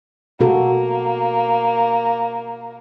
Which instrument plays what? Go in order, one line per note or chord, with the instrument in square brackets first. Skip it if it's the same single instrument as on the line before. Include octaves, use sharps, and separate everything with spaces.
[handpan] B2 F#4 A4 [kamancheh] A#3